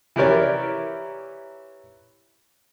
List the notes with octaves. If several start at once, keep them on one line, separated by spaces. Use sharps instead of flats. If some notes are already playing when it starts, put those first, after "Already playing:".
E3 E4 G4 A#4 C#5 D5